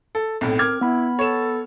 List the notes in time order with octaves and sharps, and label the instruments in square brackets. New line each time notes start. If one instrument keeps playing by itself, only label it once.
[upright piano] A4
[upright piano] B1 A2 [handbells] C4
[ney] A#4 [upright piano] D6 F6 G#6
[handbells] B3 B5 [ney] E4
[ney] A4 [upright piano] C#5 E7